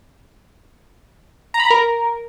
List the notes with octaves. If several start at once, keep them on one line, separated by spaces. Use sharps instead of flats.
A#5
B5
A#5
A#4